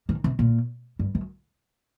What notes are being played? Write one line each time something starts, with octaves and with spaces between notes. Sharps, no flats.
D#3
C3
A#2
G2
F#2